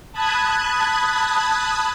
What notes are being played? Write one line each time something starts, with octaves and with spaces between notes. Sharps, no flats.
A5 B5 D#6 F#6 G#6